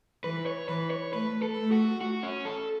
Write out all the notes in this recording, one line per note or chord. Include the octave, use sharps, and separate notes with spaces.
E3 B4
C#5
E3 B4
C#5
A3 B4
A4
A3
F#4
F#4
C#4
A4